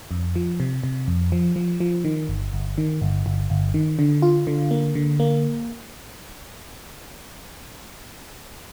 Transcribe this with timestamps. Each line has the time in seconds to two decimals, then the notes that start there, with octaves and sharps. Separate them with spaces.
0.11 F2
0.35 F3
0.60 C3
0.83 C3
1.08 F2
1.32 F3
1.56 F3
1.80 F3
2.04 D#3
2.29 G1
2.53 G1
2.78 D#3
3.01 G1
3.26 G1
3.50 G1
3.74 D#3
3.99 D3
4.22 F4
4.47 D3
4.71 A#3
4.95 D3
5.20 A#3